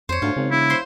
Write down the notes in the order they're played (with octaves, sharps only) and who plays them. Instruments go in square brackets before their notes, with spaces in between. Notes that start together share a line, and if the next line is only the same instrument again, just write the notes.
[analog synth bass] F2 [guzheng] C5 C#5
[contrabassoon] D2 [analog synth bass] G#2 [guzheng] F4
[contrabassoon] G#1 [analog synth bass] C#3
[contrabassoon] E1 [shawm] E4
[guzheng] C5 C6